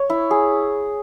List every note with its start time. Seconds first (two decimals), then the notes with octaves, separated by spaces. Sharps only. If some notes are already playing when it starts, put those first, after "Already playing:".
Already playing: C#5
0.10 E4
0.31 G#4